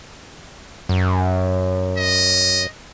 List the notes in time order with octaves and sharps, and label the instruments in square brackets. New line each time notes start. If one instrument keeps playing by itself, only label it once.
[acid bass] F#2
[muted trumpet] D#5